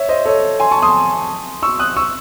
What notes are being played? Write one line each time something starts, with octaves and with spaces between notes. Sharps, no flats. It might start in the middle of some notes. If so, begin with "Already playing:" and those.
Already playing: C#5 E5
C5 D#5
A4 C#5
G#5 C6
A5 C#6
C6 D#6
C#6 E6
D#6 F#6
C#6 E6